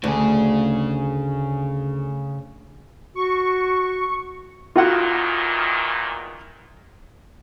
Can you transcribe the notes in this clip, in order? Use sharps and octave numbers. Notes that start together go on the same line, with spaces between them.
D2 C#3 G#4
F#4 C#6
E2 A#2 D#3 F4 F#4 F#5